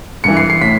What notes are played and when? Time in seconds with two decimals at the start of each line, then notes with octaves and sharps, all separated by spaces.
0.24 G2 E3 C#7
0.37 C7
0.50 C7
0.61 A2 B6